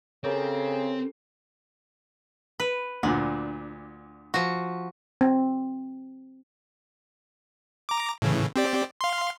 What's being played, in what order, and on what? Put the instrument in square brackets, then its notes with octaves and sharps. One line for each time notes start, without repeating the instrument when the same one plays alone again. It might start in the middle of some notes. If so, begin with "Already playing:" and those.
[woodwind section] C#3 [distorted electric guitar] C4 [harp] G4 A4 A#4
[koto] B4
[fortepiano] D2 A#2 [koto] D4
[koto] F3 F#4
[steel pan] C4
[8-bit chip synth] A#5 D6
A2 C#3 E3
C4 G4 D5
F5 C6